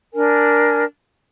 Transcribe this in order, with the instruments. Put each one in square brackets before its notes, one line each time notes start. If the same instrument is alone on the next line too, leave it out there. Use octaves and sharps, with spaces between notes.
[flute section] D4 A#4 G#5